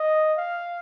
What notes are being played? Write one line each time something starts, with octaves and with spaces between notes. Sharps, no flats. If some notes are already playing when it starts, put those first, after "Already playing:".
Already playing: D#5
F5